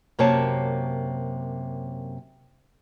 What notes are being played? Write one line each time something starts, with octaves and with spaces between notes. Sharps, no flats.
F#2 C3 A#3 C#5 A5